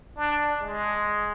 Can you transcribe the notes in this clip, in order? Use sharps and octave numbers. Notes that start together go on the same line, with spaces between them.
D4
G#3